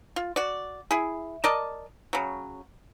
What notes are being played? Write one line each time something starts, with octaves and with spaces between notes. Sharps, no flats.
F4
F#4 D5
E4 G#4
A#4 D5 D#5 A5
C#3 F#3